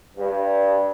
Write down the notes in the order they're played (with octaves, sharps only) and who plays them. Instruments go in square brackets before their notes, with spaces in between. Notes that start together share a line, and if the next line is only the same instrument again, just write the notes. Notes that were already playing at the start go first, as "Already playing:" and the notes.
[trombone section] G2